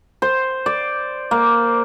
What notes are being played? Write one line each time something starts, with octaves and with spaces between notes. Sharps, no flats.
C5
D5
A#3